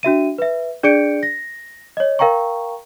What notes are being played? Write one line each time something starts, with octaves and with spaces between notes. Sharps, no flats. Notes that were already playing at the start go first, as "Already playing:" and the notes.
D4 F#4 E5 D#7
B4 E5
D4 G#4 D5 G6 C#7 D7
A#6
C#5 D#5
A#4 F5 G5 A#5 C#6